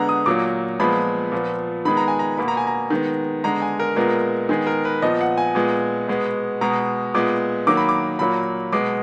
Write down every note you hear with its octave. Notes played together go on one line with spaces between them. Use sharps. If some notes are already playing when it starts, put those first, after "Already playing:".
Already playing: D3 G#3 B3 F#5 A#5
D#6
A#2 F#3 A#3 D6
A#2 F3 G#3 B3 B5
A#2 F3 B3
D#3 G#3 B3 B5
A#5
G#5
A#5
B2 A#3 B5
A#5
G#5
A#5
D#3 G#3 B3
D3 G#3 B3 A#5
G#5
A#4
A#2 G#3 B3 A#4
D#3 G#3 B3 G#4
A#4
B4
A#2 F3 B3 D#5
F#5
G#5
A#2 G#3 B3
B2 G#3 B3
B2 G#3 B3 A#5
A#2 G#3 B3 D6
D#3 F#3 A#3 D6
B5
D6
A#2 F#3 A#3 B5
B2 G#3 B3 D6